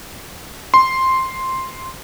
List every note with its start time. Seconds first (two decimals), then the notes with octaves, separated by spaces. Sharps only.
0.74 C6